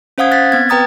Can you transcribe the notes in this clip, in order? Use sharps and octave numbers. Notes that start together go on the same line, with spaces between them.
C#4 C5 F5 F#5 D#6 G#6
F#6 A6 B6
B3 C4 G#6
B4 G5 A#5 D#6 A6